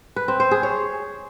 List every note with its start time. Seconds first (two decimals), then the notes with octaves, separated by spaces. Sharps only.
0.16 B4
0.28 C4
0.40 C5
0.51 G#4
0.63 C#5